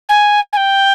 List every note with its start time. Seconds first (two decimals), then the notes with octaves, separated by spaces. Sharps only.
0.09 G#5
0.52 G#5
0.56 G5